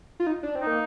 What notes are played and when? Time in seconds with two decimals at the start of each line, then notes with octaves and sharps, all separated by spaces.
0.20 F4
0.27 D#4
0.43 D4
0.55 C4
0.61 D#4
0.67 A#3